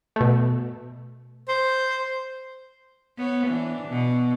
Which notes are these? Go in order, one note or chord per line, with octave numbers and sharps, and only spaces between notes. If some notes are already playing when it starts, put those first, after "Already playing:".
B2 A3
C5
B3 C#5
E3 D4
B2